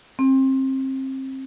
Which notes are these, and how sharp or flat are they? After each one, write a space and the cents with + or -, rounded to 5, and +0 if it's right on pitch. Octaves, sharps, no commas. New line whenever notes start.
C4 +30